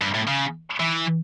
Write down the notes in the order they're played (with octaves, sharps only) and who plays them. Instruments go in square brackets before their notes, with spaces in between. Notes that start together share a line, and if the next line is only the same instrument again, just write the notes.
[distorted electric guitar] G2
A2
C#3
E3